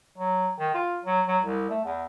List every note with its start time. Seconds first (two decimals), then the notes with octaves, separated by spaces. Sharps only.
0.18 F#3
0.59 D#3
0.74 F4
1.04 F#3
1.28 F#3
1.43 C2
1.70 A3
1.85 E2